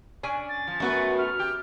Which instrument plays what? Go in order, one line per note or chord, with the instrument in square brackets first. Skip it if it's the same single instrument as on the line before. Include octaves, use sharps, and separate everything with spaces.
[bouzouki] C#4 D4 G#5
[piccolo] A6
[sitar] F3
[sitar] F#2 F#4 [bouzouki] A3 B3 B4
[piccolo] F6
[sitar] G4